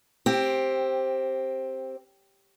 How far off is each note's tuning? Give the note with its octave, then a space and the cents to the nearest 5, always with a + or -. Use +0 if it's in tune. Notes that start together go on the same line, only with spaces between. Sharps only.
C4 +10 G4 +0